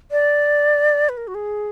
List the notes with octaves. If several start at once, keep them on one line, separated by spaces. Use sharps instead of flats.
D5
B4
A#4
F#4
G#4